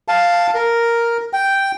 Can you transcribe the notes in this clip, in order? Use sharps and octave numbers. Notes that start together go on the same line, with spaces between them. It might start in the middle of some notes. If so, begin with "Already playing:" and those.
F5 A5
A#4
G5